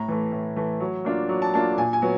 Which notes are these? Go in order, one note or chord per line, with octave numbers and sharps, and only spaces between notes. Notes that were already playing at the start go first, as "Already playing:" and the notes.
Already playing: A2 A#5
E3 A3
A2
E3 A3
F#3
A#3 D4 F4
F#3
A5
A#3 D4 F4 A5
A#2 G#5
G#5
F#3 B3